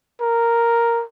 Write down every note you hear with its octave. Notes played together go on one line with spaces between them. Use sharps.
A#4